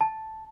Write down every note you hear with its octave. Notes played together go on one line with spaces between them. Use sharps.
A5